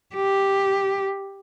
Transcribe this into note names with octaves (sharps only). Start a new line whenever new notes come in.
G4